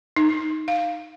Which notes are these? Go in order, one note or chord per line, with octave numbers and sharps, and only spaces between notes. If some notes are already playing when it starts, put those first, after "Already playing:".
D#4
F5